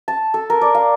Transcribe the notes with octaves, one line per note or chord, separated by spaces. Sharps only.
A5
A4
A#4
D5
F5